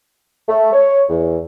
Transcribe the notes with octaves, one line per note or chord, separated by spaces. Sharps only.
A3
C#5
E2